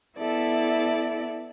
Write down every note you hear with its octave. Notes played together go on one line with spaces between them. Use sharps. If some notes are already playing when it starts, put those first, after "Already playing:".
B3 E4 A4 D5 E5